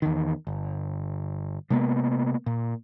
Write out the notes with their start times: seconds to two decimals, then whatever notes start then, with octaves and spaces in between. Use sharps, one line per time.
0.02 E2 D#3
0.47 G1
1.70 C3 G#3 A#3 B3
2.46 A#2